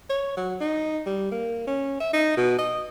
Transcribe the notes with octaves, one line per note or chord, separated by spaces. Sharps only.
C#5
F#3
D#4
G3
A#3
C#4
E5
D#4
B2
D#5